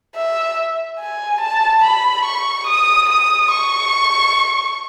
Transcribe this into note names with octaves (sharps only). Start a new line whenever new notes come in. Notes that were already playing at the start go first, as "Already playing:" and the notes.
E5
G#5
A5
B5
C#6
D#6
D#6
C#6